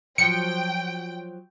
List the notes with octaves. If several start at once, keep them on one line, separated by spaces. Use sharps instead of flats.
F3 F#3 G5 C#7